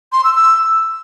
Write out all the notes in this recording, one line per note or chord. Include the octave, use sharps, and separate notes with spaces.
C6
E6
E6